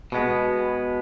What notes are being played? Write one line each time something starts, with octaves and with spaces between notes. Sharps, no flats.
B2 G#3 B3